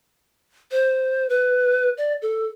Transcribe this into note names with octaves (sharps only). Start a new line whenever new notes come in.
C5
B4
D5
A4